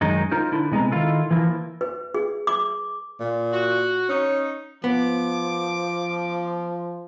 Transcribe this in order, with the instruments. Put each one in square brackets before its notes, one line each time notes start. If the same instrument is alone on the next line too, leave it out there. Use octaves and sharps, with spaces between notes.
[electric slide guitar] F#2 D#3 G#3 D#4
D#4 F4 A#4 C5
D3 E4
C3 G#3 B3 A#5
D#3 E4 F4 A4
E3 F3 A#3 E4
[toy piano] B4
G#4
D6
[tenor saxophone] A#2
[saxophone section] F#4
[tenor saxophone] C#4 [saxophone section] D#4
[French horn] F3 [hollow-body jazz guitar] B3 [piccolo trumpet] D6